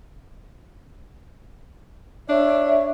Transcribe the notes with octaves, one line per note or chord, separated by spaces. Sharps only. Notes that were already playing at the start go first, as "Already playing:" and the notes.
D4 C#5 E5